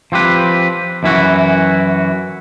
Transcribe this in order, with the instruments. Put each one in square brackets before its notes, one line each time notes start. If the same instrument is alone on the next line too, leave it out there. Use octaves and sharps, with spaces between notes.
[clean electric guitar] F3 C4 G4 B4
F#2 E3 E4 F#4